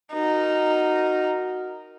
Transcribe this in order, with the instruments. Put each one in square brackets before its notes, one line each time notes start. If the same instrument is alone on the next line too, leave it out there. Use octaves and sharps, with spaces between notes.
[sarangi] D#4 [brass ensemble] F#4 A#4